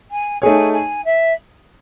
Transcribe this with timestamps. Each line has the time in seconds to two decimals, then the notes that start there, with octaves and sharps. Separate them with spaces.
0.11 G#5
0.42 A3 D#4 G#4 C#5 G#5
0.73 G#5
1.05 E5